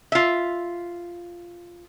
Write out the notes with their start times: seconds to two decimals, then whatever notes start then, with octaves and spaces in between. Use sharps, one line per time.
0.12 F4 E5